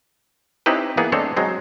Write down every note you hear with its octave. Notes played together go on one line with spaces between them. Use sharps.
C4 C#4 D#4 E4 G4 B4
E3 A#3 B3 G#4
G#3 A3 C4 D4 A4 C#5
F#3 G#3 C4